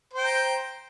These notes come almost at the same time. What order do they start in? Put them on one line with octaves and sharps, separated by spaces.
C5 G5 A#5